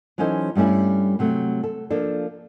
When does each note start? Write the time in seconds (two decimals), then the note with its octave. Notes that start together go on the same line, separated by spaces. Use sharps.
0.18 E3 F#3 C#4 D#4 A4 C5
0.55 G2 G3 A3 C#4 E4
1.19 C3 F#3 A3
1.63 A4
1.90 F3 A#3 D4 A4